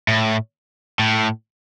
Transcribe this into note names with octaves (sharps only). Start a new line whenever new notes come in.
A2
A2